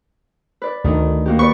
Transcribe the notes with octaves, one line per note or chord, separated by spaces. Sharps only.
B4 D5
D2 D#3
A#3 F#4 G4
B4 D5 C#6